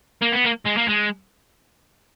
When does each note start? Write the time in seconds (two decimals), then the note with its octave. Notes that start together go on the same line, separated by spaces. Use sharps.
0.22 A#3
0.33 B3
0.45 A#3
0.66 G#3
0.78 A#3
0.89 G#3